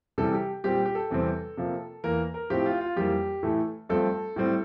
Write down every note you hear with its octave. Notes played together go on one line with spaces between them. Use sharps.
C3 E3 G3 A4
G4
A#2 G3 C4 G4
G4
A4
E2 C3 G3 C4
C3 F3 A#3
E2 E3 A#3 A#4
A#4
A2 F3 C4 G4
F4
F4
F2 E3 G3 A#3 G4
A2 E3 A3 A4
G2 F3 A3 C4 A4
A2 G3 C4